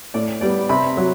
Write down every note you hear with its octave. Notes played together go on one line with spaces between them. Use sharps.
A2 D5
G3 B3 D5
C3 B5
F#3